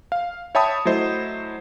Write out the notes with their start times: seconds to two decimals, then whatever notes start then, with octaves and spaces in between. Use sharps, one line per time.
0.12 F5
0.55 C#5 E5 G5 A5 B5 D#6
0.85 F#3 A3 E4 C5 D#5